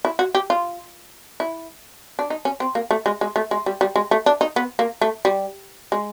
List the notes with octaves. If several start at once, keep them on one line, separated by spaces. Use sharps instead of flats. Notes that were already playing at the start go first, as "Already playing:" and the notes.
E4
F#4
G4
F4
E4
D4
D#4
C#4
C4
A#3
A3
G#3
G#3
A3
G#3
G3
G3
G#3
A3
D4
D#4
B3
A#3
A3
G3
G#3